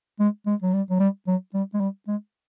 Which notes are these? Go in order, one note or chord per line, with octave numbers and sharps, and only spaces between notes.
G#3
G#3
F#3
G3
F#3
G3
F#3
G3
G#3
G3
G#3